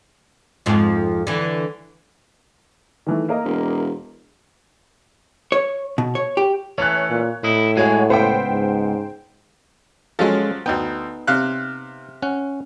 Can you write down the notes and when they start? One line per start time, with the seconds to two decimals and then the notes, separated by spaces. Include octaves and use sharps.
0.66 F2 G#2 F3
1.27 D3 E3
3.07 D#3 E3 A3
3.29 A#3 A#4 D#5
3.44 E1
5.52 C#5
5.98 B2
6.15 C#5
6.37 G4
6.78 E3 A3 C#4 C#5 F#6
7.10 A#2
7.44 A2 E4 D#5
7.77 G#3 F#4 C#5 F#5 G#5
8.10 C#2 B3 C5 G5
8.50 G#2
10.19 F3 F#3 G#3 C#4 A4
10.66 D2 B3 D#4 G5
11.27 C3 F5 F#6
12.22 C#4 F#5